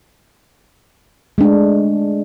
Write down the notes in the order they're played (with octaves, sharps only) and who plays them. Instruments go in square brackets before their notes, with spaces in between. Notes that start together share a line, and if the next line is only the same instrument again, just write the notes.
[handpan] G#3 A3 D4